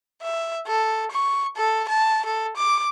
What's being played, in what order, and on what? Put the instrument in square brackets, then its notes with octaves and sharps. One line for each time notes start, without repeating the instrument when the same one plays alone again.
[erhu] E5
A4
C#6
A4
A5
A4
D6